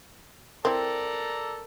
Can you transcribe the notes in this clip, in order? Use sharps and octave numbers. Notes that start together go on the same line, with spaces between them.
C4 E4 A4 A#4 D5 A#5